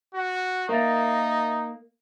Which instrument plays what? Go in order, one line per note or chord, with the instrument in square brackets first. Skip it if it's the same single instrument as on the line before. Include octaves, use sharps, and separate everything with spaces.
[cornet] F#4
[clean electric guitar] A#3 [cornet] D#4 [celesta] A#4 E5 A6